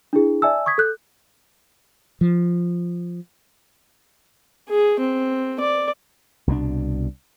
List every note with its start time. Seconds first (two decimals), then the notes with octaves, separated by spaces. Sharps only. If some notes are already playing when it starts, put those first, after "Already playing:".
0.13 D4 E4 G#4
0.42 D5 E5 G#5 A5 E6
0.66 C#6 D#6 G#6 B6
0.78 A4 F#6 G6
2.21 F3
4.69 G#4
5.00 C4
5.60 D5
6.47 C2 B2 F3 D4